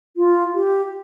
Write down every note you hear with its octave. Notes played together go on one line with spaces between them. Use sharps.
F4
G4